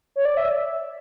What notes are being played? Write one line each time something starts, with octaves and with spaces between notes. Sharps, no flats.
C#5
D5
E5